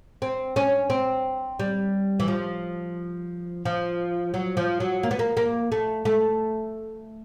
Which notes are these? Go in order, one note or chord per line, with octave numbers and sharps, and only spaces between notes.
C4
C#4
C4
G3
E3
F3
F3
F#3
F3
F#3
A#3
B3
A#3
A#3
A3
A3